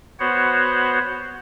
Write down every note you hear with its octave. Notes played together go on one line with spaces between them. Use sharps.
B3 F#4 C5 C#5 F#5